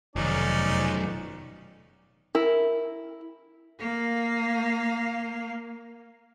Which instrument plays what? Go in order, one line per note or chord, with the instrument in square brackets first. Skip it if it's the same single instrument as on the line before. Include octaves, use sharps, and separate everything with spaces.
[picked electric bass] F1 [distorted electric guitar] B1 D#3 [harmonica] C#4 D#4 D5
[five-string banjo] E4 A#4
[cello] A#3 F5